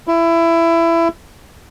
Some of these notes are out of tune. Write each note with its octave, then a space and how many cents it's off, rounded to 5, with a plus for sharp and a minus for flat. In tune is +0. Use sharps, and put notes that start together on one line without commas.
E4 +20